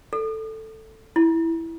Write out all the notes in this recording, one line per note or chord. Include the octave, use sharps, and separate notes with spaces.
A4
E4